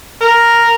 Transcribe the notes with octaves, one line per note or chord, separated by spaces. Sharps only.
A#4